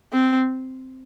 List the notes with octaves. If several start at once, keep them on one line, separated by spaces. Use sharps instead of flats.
C4